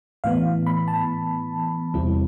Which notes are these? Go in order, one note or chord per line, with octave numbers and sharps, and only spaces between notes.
A2 E3 B3 F5
B5
A5
E2 C3 G3 C4 E4